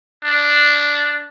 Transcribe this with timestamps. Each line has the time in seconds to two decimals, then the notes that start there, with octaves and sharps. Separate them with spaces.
0.24 D4